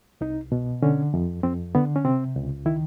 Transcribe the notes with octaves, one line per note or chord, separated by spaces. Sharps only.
C2 D#4
B2
D3 C#4
F2
F2 C4
D3 B3
C#4
C3 C4
C#2
D#3 E4